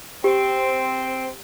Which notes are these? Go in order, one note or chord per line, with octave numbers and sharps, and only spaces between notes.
C4 G4